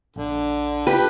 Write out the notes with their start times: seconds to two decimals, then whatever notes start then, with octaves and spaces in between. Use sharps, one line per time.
0.16 A#1 D3
0.87 F4 G4 A4 B4